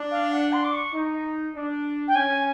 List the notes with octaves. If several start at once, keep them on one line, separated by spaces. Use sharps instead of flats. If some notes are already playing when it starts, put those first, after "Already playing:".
Already playing: D4
F5
F#5
C6
D6
C#6
D#4
D4
G5
C#4 G#5